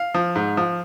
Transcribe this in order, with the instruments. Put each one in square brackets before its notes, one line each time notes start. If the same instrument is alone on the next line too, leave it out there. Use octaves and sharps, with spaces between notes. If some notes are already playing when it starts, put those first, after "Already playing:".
Already playing: [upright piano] F5
F3
G#2
F3